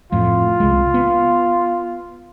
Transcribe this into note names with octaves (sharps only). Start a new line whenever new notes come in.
F2 A2 F4
C2 G#3
B3